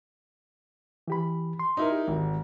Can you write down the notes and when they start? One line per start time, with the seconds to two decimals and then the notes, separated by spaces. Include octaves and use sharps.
1.08 E3 G4 B5
1.59 C6
1.77 D#4 E4 A#4
1.92 G4
2.07 G#1